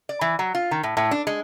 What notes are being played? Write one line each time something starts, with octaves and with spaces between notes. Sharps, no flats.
D5
E3
F#3
F4
D#3
A2
A2
D4
G#3